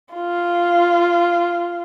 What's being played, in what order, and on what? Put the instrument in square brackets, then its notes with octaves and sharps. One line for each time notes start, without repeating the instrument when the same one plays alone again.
[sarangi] F4